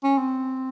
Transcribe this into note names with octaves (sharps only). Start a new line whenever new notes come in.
C#4
C4